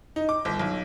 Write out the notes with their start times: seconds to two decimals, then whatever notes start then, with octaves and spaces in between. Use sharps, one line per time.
0.16 D#4
0.29 D6
0.45 G1
0.59 B1